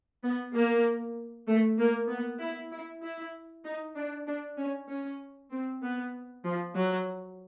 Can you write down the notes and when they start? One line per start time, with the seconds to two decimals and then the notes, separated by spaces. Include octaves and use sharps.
0.23 B3
0.54 A#3
1.47 A3
1.78 A#3
2.09 B3
2.40 E4
2.71 E4
3.03 E4
3.65 D#4
3.96 D4
4.27 D4
4.58 C#4
4.89 C#4
5.51 C4
5.82 B3
6.44 F3
6.75 F#3